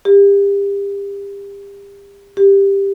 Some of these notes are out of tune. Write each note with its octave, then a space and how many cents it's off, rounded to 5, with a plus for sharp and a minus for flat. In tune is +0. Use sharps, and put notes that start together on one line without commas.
G4 +30
G4 +10